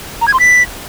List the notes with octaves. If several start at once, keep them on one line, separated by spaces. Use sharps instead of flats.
A#5
G#6
C6
B6